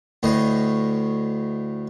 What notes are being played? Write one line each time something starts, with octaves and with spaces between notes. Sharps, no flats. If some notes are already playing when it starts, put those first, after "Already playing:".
D2 A2 D#5